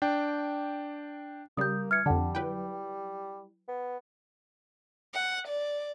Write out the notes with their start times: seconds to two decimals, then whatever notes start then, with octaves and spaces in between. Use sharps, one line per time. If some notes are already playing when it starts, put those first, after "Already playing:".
0.02 D4 G5
1.57 C#3 G3 A#3 D#6 G6
1.91 E3 F6 G#6 C#7
2.06 F2 D3 G3 F#5 A5
2.35 F#3 E4 B4 G5
3.68 B3
5.15 F#5
5.47 D5